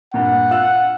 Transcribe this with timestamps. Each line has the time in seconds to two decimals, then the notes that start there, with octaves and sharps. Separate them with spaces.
0.14 G2 A#2 F#5
0.51 F4 E6 F#6